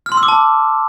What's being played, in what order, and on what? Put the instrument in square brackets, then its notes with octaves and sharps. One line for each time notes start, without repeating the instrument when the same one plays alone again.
[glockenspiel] F6
C6
E6
D6
A5